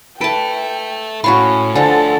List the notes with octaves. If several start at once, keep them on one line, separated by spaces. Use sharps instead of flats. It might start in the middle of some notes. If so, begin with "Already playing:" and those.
A4 B4 E5 G5 A5 D7
A2 C#4 F#4 C#5 F5 B5
D2 D3 F3 A4 F#5 G#5 A5